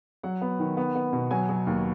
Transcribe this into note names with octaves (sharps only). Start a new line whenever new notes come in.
F#3 F#5
B3
D#3
B3
B3
B2
F#3 G#5
F#3
D#2